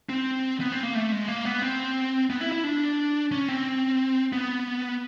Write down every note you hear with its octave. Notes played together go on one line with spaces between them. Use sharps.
C4
B3
C4
A#3
A3
G#3
A#3
B3
C4
B3
E4
E4
D4
C#4
C4
B3